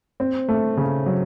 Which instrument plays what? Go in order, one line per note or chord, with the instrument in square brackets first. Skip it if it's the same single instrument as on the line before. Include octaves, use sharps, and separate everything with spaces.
[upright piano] C4
A3
C#3
F#3